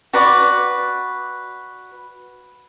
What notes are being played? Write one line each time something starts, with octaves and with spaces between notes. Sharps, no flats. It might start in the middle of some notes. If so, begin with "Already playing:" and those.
F#4 B4 D5 D6